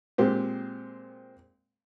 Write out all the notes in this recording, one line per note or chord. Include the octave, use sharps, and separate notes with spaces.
A#2 G#3 C4 G4